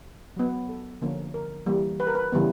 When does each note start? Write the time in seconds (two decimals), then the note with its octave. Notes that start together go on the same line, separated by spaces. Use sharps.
0.37 F#3 B3
0.69 A4
1.02 D3 F3 A#3 C#4
1.34 A#4
1.66 E3 G3 A#3
2.00 B4
2.07 A#4
2.15 B4
2.32 C#3 E3 G3 B3